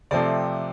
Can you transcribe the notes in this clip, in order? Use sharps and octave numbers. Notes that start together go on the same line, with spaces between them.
C3 F3 A3 C4 D5